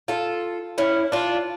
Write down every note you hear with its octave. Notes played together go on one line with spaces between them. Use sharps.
F4 A4
C#4 E4
D4 F4